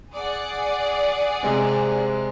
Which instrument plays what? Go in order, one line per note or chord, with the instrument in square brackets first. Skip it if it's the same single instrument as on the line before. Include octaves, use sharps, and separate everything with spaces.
[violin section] G#4 D5 F#5
[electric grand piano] C3 G#3 C4